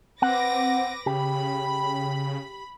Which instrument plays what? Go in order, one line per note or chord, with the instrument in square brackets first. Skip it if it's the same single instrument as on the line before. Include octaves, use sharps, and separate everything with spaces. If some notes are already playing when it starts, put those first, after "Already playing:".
[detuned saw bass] C4 [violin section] B4 D6 A#6 [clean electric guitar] F#5
[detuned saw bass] C#3 [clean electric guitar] G4 [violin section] B5